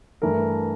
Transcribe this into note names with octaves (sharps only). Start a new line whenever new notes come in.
G2 E3 A3 A#4